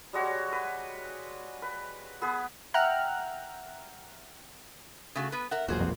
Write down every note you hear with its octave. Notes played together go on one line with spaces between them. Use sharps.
G3 G#3 F#4 C#5
B4
B4
B3 G#4 B4
E5 F#5 G5 A#5 F6 F#6
C#3 A3 F#4
B3 B4
A#4 E5 F#5
E1 B1 A#2 F#4 G#4 C5
F2